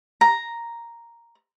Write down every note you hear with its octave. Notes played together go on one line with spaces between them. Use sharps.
A#5